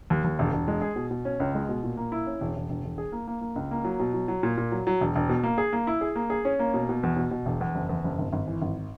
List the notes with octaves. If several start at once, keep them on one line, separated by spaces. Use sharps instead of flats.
D#2
D#2
E1
E1
G#3
G#4
B2
B2
C#4
C#2
G#3
B2
A#2
A#3
E4
C#4
E1
E1
E1
E1
G#4
A#3
A#3
A#3
C#2
A#3
F#3
B2
F#3
F#3
A#2
A#2
F#3
F#3
E1
E1
B2
A#3
G#4
A#3
E4
G#4
A#3
G#4
C#4
A#3
B2
B2
E2
B2
B2
E1
E2
F#1
E2
F#1
G#1
G#1
E3
G#1